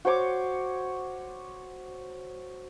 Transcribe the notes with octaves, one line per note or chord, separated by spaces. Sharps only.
F#4 C5 C#5 D6